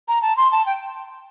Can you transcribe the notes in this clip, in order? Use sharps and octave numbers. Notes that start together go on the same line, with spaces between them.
A#5
A5
C6
A5
G5